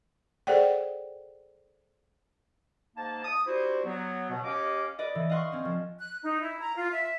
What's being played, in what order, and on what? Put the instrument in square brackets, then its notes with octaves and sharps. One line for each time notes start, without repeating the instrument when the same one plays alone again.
[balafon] G#4 A4 C5 D5 F#5 G5
[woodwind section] G#2 A#3 D#4 A5
D#6
D4 E4 F#4 G4 C5
F#3 B3
B2
D#2 C#4 G4 D#5 F5 D6
[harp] B4 D5 D#5
E3
D#5 F5 F#5 C6 C#6
C4 C#4
F3
[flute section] F#6
D#4
E4
A#5
F4
E5